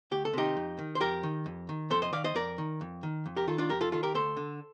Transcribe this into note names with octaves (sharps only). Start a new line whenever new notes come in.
D2 G4
A4
C3 D#3 D#4 G4
F2
D#3
C5
F2 G4 A#4
D#3
F2
D#3
F2 A4 C5
C5 D#5
D#3 D5 F5
C5 D#5
F2 A#4 D5
D#3
F2
D#3
F2
G4 A#4
D#3 F4 A4
D4 F4
F2 G4 A#4
F4 A4
D#3 F4 A4
G4 A#4
D2 A4 C5
D3